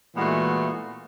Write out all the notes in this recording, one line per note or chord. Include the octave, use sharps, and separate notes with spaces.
A#2 E3 G#3 A3 B3 F#4